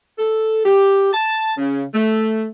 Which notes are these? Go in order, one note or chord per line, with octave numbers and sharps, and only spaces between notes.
A4
G4
A5
C#3
A3